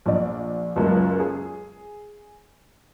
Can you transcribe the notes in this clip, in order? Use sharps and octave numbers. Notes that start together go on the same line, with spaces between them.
A#1 D5
C#2 F#2 G#3 A#3
G#4